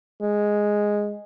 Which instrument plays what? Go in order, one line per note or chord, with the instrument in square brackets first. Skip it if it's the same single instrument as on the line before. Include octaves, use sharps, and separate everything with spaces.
[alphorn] G#3